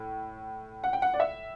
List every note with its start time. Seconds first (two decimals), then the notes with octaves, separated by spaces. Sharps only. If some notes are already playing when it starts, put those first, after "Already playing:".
Already playing: A2
0.84 F#5
0.93 G5
1.02 F#5
1.14 D5
1.20 E5